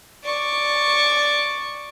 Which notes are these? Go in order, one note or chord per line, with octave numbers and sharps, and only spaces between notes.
D5 C#6